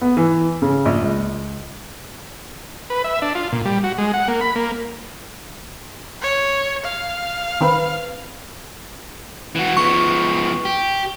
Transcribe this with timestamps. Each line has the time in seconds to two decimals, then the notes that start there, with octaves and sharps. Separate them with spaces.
0.01 B3
0.17 E3
0.62 C#3
0.85 A#1
1.02 C#2
2.90 B4
3.04 E5
3.22 D4
3.35 F4
3.52 A#2
3.65 G3
3.84 F#4
3.98 G#3
4.13 F#5
4.28 A#3
4.41 B5
4.56 A#3
6.21 C#5
6.84 F5
7.61 D#3 C4 B4
9.56 E3 F#4
9.77 F3 B3 C#6
10.65 G4